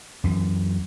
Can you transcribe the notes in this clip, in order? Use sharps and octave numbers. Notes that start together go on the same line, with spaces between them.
F#2 E3